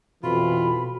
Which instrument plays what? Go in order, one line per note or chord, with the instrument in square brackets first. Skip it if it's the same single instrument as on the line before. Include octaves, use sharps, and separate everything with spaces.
[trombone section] F2 E3 [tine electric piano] B2 F#4 A4 [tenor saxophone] F4 [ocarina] B5